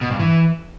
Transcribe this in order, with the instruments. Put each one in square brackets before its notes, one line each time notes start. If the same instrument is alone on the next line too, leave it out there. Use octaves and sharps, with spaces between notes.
[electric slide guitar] B2
G2
E3